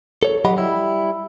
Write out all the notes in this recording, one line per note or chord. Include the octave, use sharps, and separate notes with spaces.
A4 C#5
F#3 G4 D#5 F#5 B5
G3 E4